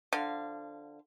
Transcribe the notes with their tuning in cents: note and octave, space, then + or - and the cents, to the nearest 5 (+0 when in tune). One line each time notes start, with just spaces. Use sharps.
D3 +5 F3 +0 F5 -20